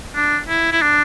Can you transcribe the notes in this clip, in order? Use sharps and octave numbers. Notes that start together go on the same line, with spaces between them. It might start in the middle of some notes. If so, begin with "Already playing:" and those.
D4
E4
E4
D4